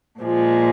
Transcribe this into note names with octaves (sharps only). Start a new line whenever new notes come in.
A#2 F3 G#3